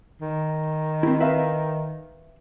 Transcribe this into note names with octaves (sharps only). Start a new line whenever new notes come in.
D#3
C4 E4
B4 E5 F5